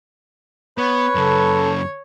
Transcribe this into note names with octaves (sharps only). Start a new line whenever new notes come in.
B3 B4 C#5
F#2 C#3 A4